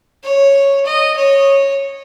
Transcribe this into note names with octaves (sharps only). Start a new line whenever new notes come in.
C#5
D#5
C#5